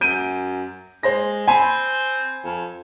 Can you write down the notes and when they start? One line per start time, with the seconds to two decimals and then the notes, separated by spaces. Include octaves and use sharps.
0.01 F#2 G6 D7 D#7
1.03 G#3 C5 C6 A#6
1.48 C4 G#5 B5 C6
2.45 F2